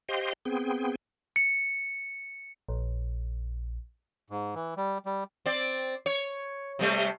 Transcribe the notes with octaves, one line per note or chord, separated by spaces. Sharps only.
G4 C5 D#5 F5 G5 C6
B3 C4 G#4 G5
C#7
A#1
G#2
E3
G3
G3
C4 D5
C#5
C3 G3 A3